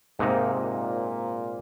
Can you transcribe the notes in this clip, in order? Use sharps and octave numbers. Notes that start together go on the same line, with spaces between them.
G#2 C3 A#3 D#4
A#2